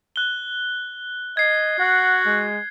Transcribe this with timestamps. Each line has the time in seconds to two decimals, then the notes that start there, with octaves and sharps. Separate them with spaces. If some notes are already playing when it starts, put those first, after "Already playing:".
0.16 F#6 G7
1.37 D#5 G#6 C7
1.80 F#4 F#5
2.26 G#3